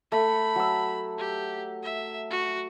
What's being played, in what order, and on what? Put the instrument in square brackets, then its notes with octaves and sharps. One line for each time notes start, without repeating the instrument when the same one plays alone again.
[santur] A3 [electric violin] B5
[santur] F#3 E6
[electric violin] G4
E5
F#4